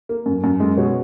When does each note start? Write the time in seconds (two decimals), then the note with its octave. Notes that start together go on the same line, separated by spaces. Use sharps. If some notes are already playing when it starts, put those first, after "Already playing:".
0.09 A#3
0.26 F#2
0.44 F#2
0.60 G#3
0.77 B2 C#5